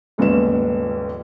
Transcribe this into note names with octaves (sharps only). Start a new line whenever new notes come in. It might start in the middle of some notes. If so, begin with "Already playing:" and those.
D#1 A#1 G#2 C#3 B3 E7